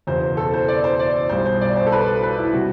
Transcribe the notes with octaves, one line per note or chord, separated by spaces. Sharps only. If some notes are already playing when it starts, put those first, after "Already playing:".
F#1 E2 B2 C5
A4
C5
D5
C5
D5
B1 B2 G3 C5
C5
D5
C5
A4
B4
B4
E4
C3 G3 F#4